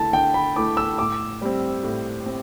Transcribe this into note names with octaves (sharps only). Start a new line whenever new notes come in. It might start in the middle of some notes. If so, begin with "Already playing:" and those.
Already playing: D3 A3 E4 A5
D3 G5
B5
A3 E4 D6
E6
A2 D6
G3 C4
A2
C4